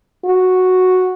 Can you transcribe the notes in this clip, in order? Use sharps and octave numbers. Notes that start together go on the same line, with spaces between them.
F#4